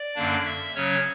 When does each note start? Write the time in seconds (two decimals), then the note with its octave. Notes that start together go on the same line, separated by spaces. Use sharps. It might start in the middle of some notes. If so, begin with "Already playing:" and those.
Already playing: D5
0.15 F#2 D3 A#3 D4
0.45 E5
0.75 C#3 F#3 C#4 C#5